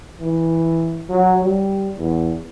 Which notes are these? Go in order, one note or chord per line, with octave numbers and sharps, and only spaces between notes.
E3
F#3
G3
E2